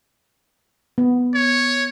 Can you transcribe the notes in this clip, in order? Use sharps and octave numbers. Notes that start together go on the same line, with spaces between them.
B3
C#5